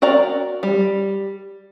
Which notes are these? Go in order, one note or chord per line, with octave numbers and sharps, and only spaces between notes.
F#4 A#4 D5 A#5
G3